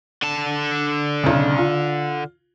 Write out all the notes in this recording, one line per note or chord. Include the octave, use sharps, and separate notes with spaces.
D3 A5
B1 C#3
F4